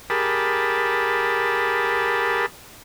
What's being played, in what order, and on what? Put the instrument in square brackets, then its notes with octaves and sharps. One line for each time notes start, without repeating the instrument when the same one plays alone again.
[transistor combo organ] G4 G#4 A#4 A5 B5